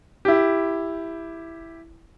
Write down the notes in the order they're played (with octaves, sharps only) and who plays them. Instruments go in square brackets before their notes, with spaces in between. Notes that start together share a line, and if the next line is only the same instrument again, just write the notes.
[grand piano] E4 G4